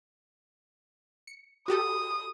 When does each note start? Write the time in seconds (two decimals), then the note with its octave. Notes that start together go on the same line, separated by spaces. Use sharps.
1.27 C#7
1.68 F#4 G4 A4 D#6